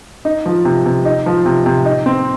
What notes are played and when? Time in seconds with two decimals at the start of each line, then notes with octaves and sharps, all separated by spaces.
0.25 D#4
0.46 F3
0.65 C3
0.86 C3
1.05 D#4
1.26 F3
1.46 C3
1.66 C3
1.86 D#4
2.06 C4